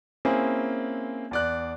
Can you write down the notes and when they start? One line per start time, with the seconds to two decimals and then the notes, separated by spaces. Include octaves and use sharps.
0.25 A#3 C4 C#4 E4 G#4
1.31 E2 D5 F#6